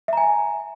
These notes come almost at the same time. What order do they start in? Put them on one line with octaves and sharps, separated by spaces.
E5 A#5 G#5